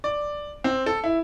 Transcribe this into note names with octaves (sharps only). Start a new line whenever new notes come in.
D5
C4
A4
E4